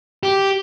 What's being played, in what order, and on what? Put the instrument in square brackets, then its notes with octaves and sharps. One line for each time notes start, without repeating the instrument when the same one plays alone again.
[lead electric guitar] G4